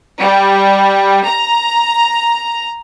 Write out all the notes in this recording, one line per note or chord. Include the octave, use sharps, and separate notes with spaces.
G3
A#5